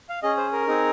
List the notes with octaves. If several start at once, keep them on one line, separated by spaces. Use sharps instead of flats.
F5
C#4 G#4 D#5
C5
A#4
C4 D#4 G#4